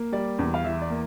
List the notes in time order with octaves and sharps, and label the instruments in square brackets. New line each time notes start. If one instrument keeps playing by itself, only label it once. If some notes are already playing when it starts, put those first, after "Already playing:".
Already playing: [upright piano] A#3
G3 D5
E2
F5
E3 E5
D5
A#3